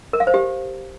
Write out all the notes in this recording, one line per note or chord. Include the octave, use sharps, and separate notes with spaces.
A#4
F5
C5
G4